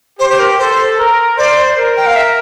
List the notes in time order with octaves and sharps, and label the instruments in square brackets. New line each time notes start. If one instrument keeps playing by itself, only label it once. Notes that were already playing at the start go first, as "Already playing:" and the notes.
[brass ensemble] G4 [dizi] C5
[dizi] C5
A#4
[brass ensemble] A4 [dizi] C5
[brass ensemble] A#4
[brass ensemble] C5 [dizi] D5
[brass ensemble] A#4
[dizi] G5
F5
E5